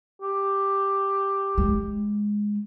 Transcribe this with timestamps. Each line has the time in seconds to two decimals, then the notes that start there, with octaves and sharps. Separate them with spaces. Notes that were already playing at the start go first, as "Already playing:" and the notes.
0.21 G4
1.58 G#3